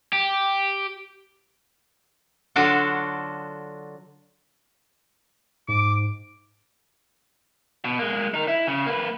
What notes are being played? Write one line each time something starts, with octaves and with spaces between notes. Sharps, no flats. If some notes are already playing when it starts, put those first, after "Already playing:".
G4
D3 F#3 D4 F4 F#4 A4
G#2 D6
B2
G#3 A#3
D#4 A#4
E4
C#3
A#3 B4